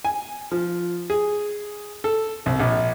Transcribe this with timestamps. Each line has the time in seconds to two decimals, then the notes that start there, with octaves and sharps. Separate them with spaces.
0.05 G#5
0.52 F3
1.10 G#4
2.04 A4
2.46 C2
2.60 A#1